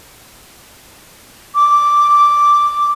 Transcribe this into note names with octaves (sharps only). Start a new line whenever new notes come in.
D6